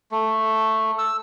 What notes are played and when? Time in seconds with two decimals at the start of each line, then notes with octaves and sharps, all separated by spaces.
0.11 A3
0.98 E6